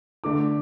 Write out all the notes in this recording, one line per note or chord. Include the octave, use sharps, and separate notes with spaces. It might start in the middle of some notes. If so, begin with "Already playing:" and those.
D3 A3 D4 D6